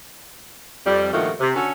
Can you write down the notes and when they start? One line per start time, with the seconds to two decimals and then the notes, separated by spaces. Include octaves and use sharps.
0.85 F2 G3
1.12 G2 A#2 D#3 F3 A3 F#4
1.39 C3
1.55 D3 C#4 F#4 A4